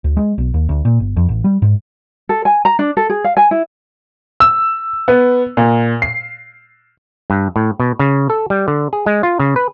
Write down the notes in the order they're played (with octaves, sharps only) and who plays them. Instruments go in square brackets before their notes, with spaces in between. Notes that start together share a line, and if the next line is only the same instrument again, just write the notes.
[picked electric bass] D2
G#3
B1
D#2
D2
A#2
G1
F2
A1
G3
G#2
[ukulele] A4
G#5
A#5
D4
A4
G#4
F5
G#5
E4
[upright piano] E6
B3
A#2
C7
[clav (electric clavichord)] G2
A2
B2
C#3
A4
G3
D3
G#4
G#3
F4
C#3
B4